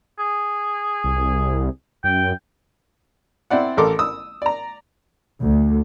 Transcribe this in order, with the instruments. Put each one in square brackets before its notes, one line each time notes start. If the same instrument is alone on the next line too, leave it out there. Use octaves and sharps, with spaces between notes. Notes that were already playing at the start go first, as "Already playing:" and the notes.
[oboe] G#4
[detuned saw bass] C2
[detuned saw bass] F#2 [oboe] G5
[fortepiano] C4 E4 D5 F#5
A1 A3 A4 A#4 C6 D6
D#6 E6
D5 A#5
[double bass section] D2